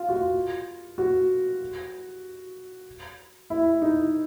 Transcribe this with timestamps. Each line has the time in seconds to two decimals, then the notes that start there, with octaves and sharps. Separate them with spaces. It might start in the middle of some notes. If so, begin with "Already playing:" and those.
Already playing: F4
0.09 F#4
0.14 F4
0.98 F#4
3.50 E4
3.82 D#4